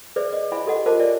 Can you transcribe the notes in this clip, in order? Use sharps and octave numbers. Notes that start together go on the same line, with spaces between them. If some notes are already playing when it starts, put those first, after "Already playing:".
G#4 B4 C5 D5 E5
D#5
E4 C5 E5 F5 G#5 B5
F#4 G4 A4 D#5 F#5
F4 A#4 C5 D#5 A5 D6
B4 C#5 D5 E5 G#5